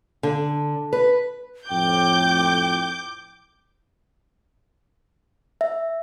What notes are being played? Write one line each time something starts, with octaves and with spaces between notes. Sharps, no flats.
D3
B4
F2 A2 G5 D6 G6
E5